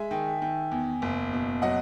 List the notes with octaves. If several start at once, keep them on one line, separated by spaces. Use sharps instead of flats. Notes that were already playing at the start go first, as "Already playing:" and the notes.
Already playing: G#3 E5 G#5
D#3
D#3
E2
F#1
B2
F#3 D#5 F#5